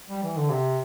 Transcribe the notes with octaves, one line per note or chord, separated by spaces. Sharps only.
G3
E3
D3
C3